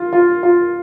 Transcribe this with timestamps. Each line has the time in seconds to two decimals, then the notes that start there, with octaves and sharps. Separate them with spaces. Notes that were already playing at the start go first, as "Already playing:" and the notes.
Already playing: F4
0.13 F4
0.43 F4